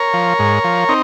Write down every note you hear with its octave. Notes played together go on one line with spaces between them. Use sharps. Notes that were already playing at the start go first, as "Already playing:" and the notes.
Already playing: A#4 C#5
F3
G#2
F3
C4 D#4